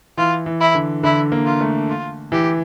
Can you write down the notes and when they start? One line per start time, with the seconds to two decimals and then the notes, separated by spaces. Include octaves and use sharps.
0.18 E3 F4
0.46 E3
0.60 E4
0.75 D3
1.03 D3 E4
1.32 A#3
1.46 F4
1.61 A3
1.90 F4
2.32 E3 G4